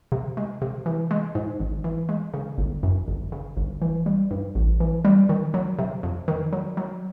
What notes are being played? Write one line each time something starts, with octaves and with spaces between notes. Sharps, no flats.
C3
G#3
C3
E3
G#3
G#2
G#1
E3
G#3
C#3
G1
F#2
G1
C#3
G1
E3
G3
G2
A1
E3
G3
D#3
F#3
C3
F2
D#3
F#3
F#3